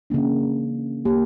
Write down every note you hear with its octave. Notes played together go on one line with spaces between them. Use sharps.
C#3 E3 A#3 D4
A#3 G4